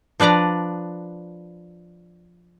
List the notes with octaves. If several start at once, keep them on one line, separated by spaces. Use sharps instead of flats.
F3 D4 B4 D5 A#5